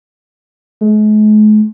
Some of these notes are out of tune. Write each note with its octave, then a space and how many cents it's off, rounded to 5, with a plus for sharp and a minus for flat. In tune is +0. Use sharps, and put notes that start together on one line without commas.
G#3 +45